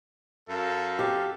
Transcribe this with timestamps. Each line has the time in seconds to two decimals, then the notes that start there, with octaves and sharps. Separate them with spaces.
0.49 F#2 A4 F5
0.99 G4 A4